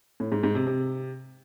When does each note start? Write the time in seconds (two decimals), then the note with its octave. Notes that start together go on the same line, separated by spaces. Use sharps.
0.20 A2
0.32 G#2
0.43 G#2
0.55 C3
0.67 C3